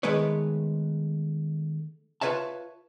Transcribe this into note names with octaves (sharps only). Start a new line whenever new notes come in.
D#3 G#3 A3 B3 B4 C#5
F4 B4 C#5 E5 A5